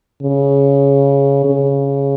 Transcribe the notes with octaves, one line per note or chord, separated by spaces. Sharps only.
C#3
C#3